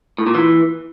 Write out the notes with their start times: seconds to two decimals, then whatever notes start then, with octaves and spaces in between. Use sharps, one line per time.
0.18 A2
0.27 A#2
0.35 E3